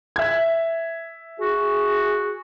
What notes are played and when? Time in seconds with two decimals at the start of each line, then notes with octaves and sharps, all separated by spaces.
0.16 E5 G#6
1.40 F#4 G#4